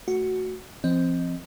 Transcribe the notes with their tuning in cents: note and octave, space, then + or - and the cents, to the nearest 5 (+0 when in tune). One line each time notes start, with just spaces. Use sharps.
A3 +0 F#4 +5
F3 -35 C4 +0 D#5 +0